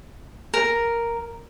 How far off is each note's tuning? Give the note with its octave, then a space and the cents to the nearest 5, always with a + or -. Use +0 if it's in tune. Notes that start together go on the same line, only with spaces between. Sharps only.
A#4 +0